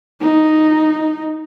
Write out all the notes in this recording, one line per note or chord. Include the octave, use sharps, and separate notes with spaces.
D#4